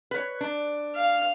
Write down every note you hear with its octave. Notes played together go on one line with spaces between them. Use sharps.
B4 C#5
D4
F5